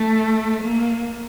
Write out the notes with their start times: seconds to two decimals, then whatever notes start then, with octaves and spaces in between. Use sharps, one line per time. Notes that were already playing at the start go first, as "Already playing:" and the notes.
Already playing: A3
0.62 A#3